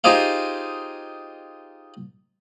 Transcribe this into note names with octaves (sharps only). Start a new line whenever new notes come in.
D#4 F4 G4 G#4 C5 F5